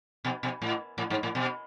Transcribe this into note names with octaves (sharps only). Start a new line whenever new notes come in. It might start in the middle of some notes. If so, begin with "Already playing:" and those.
B2
B2
A2
A2
G#2
A2
B2